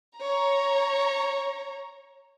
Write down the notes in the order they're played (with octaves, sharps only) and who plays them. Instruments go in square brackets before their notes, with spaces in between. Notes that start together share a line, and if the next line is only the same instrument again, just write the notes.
[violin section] C#5 A#5